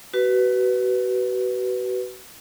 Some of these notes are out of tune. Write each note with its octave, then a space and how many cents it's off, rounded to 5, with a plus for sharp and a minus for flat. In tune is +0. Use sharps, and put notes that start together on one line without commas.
F#4 +30 B4 +0